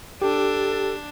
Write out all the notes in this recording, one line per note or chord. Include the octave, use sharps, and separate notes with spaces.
D4 G4 A4